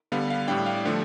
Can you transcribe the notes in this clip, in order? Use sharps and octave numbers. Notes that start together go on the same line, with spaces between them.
D3 G3 B3 F5
F5
A2 G3 D4 G5
F5
D3 F3 A3